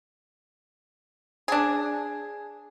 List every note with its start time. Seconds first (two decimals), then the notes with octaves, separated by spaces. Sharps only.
1.48 D4 G#4